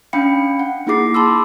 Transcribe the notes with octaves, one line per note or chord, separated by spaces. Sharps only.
C#4 D4 F5 G5 B5 C#7
F#5
A#3 D#4 E4 G#4 D6 C7
A5 B5 C6 D6 E6